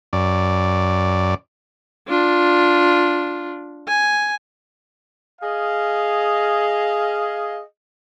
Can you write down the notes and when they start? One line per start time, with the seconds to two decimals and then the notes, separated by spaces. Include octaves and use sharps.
0.13 F#2 D5
2.08 D4 F4
3.88 G#5
5.42 G#4 D#5 F5